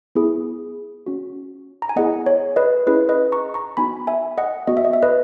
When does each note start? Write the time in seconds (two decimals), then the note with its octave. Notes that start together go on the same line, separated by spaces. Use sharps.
0.15 B3 E4 G#4
1.06 C#4 F#4
1.82 A#5
1.89 G#5
1.96 B3 E4 G#4 D#5 F#5
2.26 C#5
2.56 B4 D#5
2.87 C#4 E4 G#4 B4
3.09 B4 D#5
3.32 A#5 C#6
3.54 A#5 C#6
3.77 B3 D#4 F#4 G#5 B5
4.07 E5 G#5
4.38 D#5 F#5
4.67 B3 F#4 D#5
4.77 E5
4.85 D#5
4.93 E5
5.03 B4 D#5